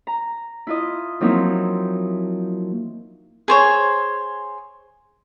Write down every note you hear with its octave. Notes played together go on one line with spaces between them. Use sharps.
A#5
E4 F4 D#5
F3 F#3 A#3 C4 D#4 E4
G#4 C5 C#5